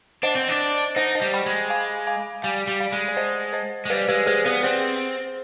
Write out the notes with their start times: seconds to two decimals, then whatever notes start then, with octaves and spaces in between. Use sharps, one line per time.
0.23 D4 C5 D#5
0.36 C4
0.49 D4
0.96 D#4 C5 D#5
1.15 C5 D#5
1.21 G3
1.34 G5 B5
1.46 G#3
1.70 F5 G#5
2.07 F5 G#5
2.43 G3 F5 G#5
2.67 G3
2.80 D5 F5
2.92 G#3
3.08 D5
3.17 C5 D#5
3.53 C5 D#5
3.85 G#3
3.90 G3 B4 D5
4.08 G#3 G4 B4
4.26 G#3 G#4 C5
4.45 B3 B4 D5
4.63 C4 G#4 C5